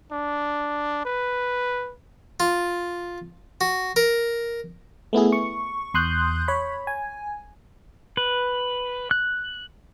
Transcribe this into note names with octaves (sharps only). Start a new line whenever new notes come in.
D4
B4
F4
F#4
A#4
A3 B3 E4 G#4
C#6
E2 C6 D#6 F#6 G6
C#5 B5
G#5
B4
F#6